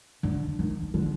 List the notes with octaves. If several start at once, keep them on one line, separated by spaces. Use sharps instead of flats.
D3
D#3
D3